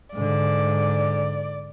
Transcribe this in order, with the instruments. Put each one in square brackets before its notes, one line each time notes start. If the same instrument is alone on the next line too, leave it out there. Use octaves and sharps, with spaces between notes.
[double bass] G#2 D3 [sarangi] D5